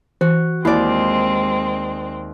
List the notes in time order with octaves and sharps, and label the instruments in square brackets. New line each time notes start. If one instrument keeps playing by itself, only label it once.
[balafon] E3 [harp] F#4
[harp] D#2 D5 [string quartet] G#3 C4 [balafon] E4